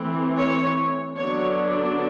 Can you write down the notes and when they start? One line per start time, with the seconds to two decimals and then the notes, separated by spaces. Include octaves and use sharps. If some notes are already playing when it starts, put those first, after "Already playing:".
Already playing: E3 A3 C4
0.37 C#5
1.17 D3 F#3 B3 D4 C#5